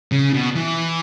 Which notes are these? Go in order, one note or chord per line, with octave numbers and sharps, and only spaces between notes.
C#3
B2
E3